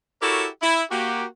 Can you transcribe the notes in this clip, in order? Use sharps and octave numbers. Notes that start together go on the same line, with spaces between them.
E4 F#4 G4 A4 A#4 C#5
E4
A#3 F#4 G4